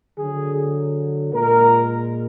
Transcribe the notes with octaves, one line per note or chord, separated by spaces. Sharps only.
D3 F#3 G#4
A#2 G#3 A#4